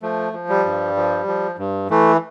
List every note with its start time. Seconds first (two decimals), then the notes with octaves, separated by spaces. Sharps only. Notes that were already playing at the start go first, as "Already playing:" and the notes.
0.02 F3 A3
0.33 F3
0.49 G3
0.66 G2
0.96 F3
1.27 F3
1.59 G2
1.90 E3 A3